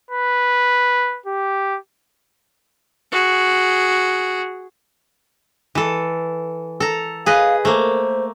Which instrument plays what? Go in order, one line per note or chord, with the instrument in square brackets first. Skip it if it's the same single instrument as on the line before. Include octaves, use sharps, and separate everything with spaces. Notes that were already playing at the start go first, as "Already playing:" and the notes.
[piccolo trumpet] B4
G4
[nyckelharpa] F#4 G#4
[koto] E3 A4
A4 A#5
[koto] G#4 B4 D#5 [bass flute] F5
[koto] A3 A#3 [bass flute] C5